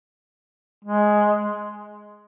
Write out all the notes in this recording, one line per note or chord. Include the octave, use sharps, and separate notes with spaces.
G#3